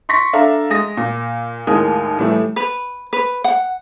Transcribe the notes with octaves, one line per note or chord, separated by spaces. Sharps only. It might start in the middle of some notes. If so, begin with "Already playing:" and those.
C6 C#6 A#6 B6
D4 A4 E5 F5 A#5
G#3 D#6 A#6
A#2
D#2 A2 G#3 A#4 G#5 D#6
A2 E3 G3 A3
B4
B4
F#5